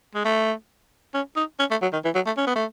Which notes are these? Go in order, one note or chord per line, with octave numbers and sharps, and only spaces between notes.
G#3
A3
C#4
D#4
C#4
A3
F#3
D#3
E3
F#3
A3
C#4
B3
A3